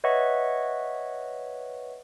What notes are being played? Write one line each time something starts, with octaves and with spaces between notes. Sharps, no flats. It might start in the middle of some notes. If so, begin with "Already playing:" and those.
B4 C#5 D#5 E5 F#5 C#6